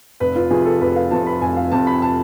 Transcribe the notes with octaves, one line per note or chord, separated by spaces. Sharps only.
F1 B4
F4
F2 C3 F3 G#4
A4
F1 B4
F5
F2 C3 F3 A5
B5
F1 G#5
F5
F2 C3 F3 A5
B5
A5